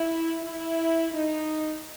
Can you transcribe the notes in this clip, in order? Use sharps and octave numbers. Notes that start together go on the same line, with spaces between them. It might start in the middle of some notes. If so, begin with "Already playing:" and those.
Already playing: E4
E4
D#4